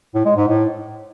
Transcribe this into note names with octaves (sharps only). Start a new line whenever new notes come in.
A2
G#3
G#2
A2